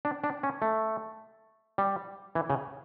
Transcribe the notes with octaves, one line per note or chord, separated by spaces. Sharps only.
D4
D4
C#4
A3
G3
E3
C#3